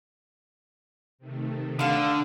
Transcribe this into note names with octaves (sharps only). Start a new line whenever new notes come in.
C3 D#3 A3
D3 B4 F5